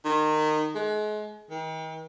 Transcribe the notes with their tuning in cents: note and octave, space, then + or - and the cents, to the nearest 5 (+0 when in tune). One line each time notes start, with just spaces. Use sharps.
D#3 -20
G#3 +35
D#3 +40